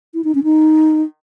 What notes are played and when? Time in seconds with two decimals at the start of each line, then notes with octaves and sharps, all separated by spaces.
0.14 E4
0.24 D#4
0.35 C#4
0.44 D#4